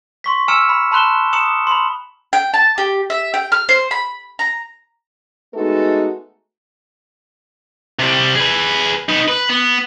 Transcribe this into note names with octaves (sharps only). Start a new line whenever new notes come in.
C6 C#6 B6
G#5 A#5 E6 F6 C#7 E7
B5
A5 B5 C6 F#6 E7 G7
A#5 D#6 C#7 E7 F#7
B5 C6
G5
A5
G4
E5
G5
F6
C5
B5
A#5
G#3 A3 B3 D#4 F#4 A4
C3 G3
G#4 B4
D#4 B4
B4
B3